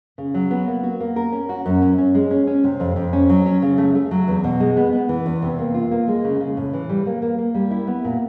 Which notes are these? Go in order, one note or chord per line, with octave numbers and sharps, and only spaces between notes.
C#3
F#3
B3
A#3
F#4
A#3
A#4
C#4
F#4
F#2
C#4
C#4
G#3
C#4
C#4
C3
F2
F2
C#4
F#3
C#4
C#3
A3
A3
F#3
E2
B2
G#3
B3
B3
E3
E2
C3
A#3
F4
A#3
G#3
C#3
C#3
A2
E3
G3
A#3
A#3
A#3
G3
E4
B3
A#2